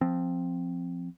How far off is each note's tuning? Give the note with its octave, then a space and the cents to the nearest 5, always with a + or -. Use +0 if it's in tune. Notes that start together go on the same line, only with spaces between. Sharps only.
F3 +0 C4 +0